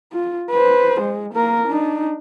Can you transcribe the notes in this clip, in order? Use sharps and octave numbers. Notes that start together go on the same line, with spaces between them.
F4
B4 C5
G#3
A#3 A#4
D4 D#4